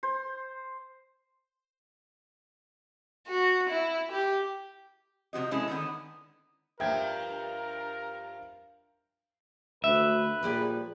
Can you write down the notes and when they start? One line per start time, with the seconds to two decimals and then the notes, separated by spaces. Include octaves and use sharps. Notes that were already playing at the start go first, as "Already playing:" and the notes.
0.03 C5
3.28 F#4
3.69 E4
4.11 G4
5.33 C3 F3 F#4 D#5
5.51 G#3 C#4 E4 G#4 A4
5.68 D3 D#3 B3
6.80 G2 F3 A#4 E5 G5 G#6
9.84 D2 B4 E5
10.43 A#2 F3 G3 G#4